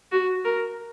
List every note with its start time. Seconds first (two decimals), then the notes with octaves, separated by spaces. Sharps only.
0.12 F#4
0.44 A#4